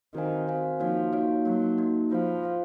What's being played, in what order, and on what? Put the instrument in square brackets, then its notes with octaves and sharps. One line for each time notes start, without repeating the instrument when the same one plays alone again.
[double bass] D#3 [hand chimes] C4 F#4 C5 F5 G#5
[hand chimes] C4 F#4 C5 F5 G#5
[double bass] F3 [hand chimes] A#3 D#4 F#4 C#5 F5
[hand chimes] A#3 D#4 F#4 C#5 F5
[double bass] F#3 [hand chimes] A#3 D#4 F#4
[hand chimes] A#3 D#4 F#4
[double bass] F3 [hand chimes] F4 C5 F5
[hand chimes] F4 C5 F5